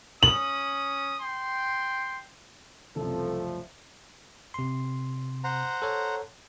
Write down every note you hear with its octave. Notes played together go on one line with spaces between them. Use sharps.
C#4 D#6 F#7
G5 C6
F#1 C2 F3 A3 A4
C3 C6
C5 F#5 A#5
A4 C#5